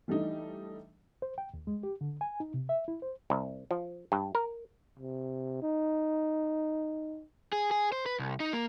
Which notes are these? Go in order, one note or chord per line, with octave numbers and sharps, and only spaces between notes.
E3 G3 A3 D4 D#4
C5
G5
D#2
G#3
G4
D3
G#5
D#4
C3
E5
E4
C5
C2
F3
G2
A#4
C3
D#4
G#4
G#4
C5
B4
C2
D#4
A#3